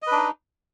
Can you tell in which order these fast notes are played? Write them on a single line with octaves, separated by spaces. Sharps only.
D#5 B4 D4 D#4